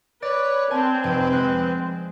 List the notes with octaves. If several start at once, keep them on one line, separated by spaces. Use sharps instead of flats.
B4 C#5 D5 D6 A6
C4 G#5 A5
F1 B4
G#3 F#6